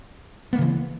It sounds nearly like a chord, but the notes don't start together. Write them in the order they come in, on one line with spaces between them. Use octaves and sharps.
B3 A#3 C#3 E3